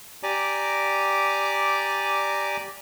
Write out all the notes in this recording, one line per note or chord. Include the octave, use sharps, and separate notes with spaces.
G4 D5 G#5 A#5 D6